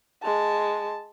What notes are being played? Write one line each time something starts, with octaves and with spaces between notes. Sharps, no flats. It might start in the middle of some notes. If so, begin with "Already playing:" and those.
G#3 A5